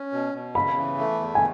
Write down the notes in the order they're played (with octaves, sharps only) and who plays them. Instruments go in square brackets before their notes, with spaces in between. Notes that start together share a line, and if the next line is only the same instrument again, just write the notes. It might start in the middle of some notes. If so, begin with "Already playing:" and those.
Already playing: [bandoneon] C#4
B2
B2
[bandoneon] C#3 [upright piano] B5
[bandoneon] E3
A3
E2
[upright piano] G#5